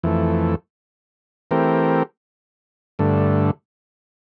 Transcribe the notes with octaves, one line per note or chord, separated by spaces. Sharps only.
F2 E3 A3
E3 A3 C4 G4 A#4
G2 D3 A3